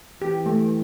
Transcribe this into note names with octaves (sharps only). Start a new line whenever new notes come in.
E3 G4
A3